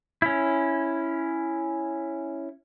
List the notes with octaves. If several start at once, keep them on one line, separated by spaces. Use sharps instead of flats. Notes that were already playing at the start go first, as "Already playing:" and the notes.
C#4 E4